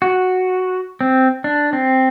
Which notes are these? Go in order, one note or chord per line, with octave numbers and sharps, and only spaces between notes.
F#4
C4
D4
C4